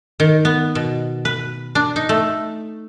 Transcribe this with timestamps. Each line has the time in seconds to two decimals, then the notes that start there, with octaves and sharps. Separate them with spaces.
0.20 D#3
0.45 B3
0.75 B2
1.25 B4
1.75 D4
1.96 D#4
2.09 A3